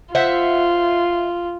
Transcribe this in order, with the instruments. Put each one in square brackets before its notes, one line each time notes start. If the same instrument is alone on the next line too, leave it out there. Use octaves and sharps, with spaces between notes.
[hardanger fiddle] F4 [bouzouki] C5 E5 F#5